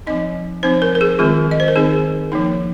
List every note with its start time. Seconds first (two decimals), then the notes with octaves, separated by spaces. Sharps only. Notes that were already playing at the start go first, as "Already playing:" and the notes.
0.07 F3 C4 D#4 D#5
0.63 F3 C4 D#4 C5
0.82 A#4
0.95 A#4
1.01 G#4
1.19 D#3 G#3 C4 F4
1.51 D#5
1.60 C5
1.68 A#4
1.75 D#3 C4 D#4 G#4
2.32 F3 A#3 D#4